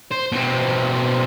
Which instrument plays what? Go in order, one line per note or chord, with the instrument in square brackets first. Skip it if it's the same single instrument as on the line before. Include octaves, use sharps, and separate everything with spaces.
[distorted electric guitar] C5
B2 C4